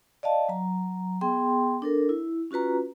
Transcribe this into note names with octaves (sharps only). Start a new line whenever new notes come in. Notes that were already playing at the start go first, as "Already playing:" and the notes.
D5 D#5 F5 A5
F#3 A#5
B3 G#4 G5 C6
D4 A4 A#4
E4
C#4 F4 F#4 B4 A#5